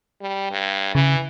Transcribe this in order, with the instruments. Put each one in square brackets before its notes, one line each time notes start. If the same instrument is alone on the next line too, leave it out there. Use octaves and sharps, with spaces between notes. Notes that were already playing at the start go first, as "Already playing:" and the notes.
[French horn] G3
G2
[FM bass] C#3 [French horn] E3